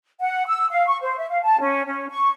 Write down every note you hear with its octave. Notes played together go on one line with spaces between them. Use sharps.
F#5
E6
F5
C#6
C5
E5
F5
A5
C#4
C#4
C#6